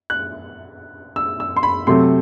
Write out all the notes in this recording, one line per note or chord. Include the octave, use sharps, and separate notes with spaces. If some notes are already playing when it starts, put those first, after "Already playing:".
F#6
E6
E6
C6
B5
C3 F#3 A3 C4 C6